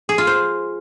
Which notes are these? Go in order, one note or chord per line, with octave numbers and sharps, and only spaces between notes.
G#4
F4
C5